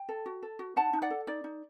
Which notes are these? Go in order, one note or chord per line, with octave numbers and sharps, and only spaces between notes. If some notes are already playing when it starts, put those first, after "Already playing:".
Already playing: G5
A4
F#4
A4
F#4
D#4 F#5 A5
D#4
D5 F#5
A4
D#4 D5
D#4